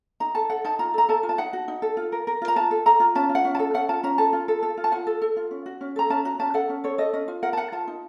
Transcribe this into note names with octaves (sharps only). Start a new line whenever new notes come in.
D#4 A#5
A4 A5
A4 F#5
D#4 A5
F4 A#5
A4 A#5
A4 A5
F4
A5
D#4 F#5
F#4
D#4
A4
F4
A#4
A#4
F4
A#5
F4 A5
A4
A4 A#5
F4
C#4 A5
F4
F#5
C#4
A5
A4
C#4 F#5
F4 A5
C#4 A#5
A4 A5
F4
A4
A4
F4
A5
F4 F#5
A4
A4
F4
C#4
F#4
C#4
A4 A#5
C#4 A5
F#4 A#5
C#4 A5
A4 F#5
C#4
A4 C#5
A4 D#5
C#4 D#5
F4
A#4 F#5
A5
A#4 F#5
F4 A5
D#4